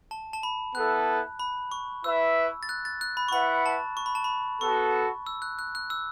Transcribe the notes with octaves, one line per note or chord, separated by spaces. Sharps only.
A5
A5
B5
B3 E4 A4 F#6
B5
C#6
E4 B4 E5 E6
A6
F#6
A6
F#6
B5
C#6
E4 B4 F#5 B5
A5
C#6
B5
A5
B5
B3 F#4 A4 C#6
E6
F#6
F#6
F#6
E6